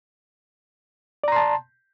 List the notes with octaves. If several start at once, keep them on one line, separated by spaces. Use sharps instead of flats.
D5 A5 A#5 C6